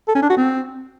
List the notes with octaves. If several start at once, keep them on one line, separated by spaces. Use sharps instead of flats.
A4
C#4
D4
F#4
C4